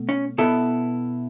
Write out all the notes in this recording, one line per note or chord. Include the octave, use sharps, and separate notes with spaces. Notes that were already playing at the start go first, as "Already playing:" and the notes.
Already playing: B2 A3
C#4
B2 B3 E4 A4